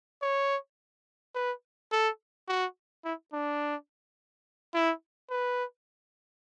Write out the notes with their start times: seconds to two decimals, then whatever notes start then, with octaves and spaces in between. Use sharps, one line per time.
0.22 C#5
1.35 B4
1.92 A4
2.48 F#4
3.05 E4
3.33 D4
4.74 E4
5.30 B4